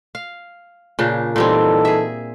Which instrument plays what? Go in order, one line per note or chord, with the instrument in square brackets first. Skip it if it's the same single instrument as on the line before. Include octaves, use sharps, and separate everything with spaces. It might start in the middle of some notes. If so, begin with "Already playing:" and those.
[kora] F5
A#2 C#3 D4
[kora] A#2 G3 C4 [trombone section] E3 D#4 A4
[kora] G#4 E5